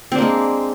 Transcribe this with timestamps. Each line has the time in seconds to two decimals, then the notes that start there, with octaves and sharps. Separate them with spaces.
0.12 C4
0.15 D4
0.18 A#3
0.22 G#3